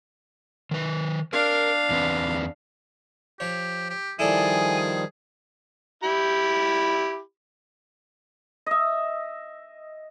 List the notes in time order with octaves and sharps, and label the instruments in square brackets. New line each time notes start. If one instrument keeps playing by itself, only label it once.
[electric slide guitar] D#3 B4
[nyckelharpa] D4 F5 [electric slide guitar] A#4
[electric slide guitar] E2 C4 B4
[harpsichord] F3 C#5 [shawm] G4
[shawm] G4
[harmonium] D#3 F3 G3 [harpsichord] E4 A4 D5 [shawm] G#4 [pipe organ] G#5
[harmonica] E4 G4 B5
[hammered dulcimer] D#5 E5